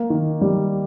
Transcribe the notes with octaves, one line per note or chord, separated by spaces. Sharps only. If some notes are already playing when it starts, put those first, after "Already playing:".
Already playing: A#3
D#3
G3